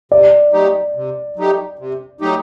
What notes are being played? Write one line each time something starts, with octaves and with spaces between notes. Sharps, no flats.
C3 D5
F#3 A3 D#4 G4
C3
F#3 A3 D#4 G4
C3
F#3 A3 D#4 G4